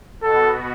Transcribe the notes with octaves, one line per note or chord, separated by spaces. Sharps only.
B2 B3 F#4 A4